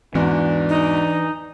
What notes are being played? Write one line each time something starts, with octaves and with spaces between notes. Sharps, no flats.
E2 G#2 E3 D4 F#4
D#4